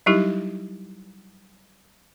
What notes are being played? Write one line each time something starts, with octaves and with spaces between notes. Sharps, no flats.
F#3 G3 D#4 E4 G4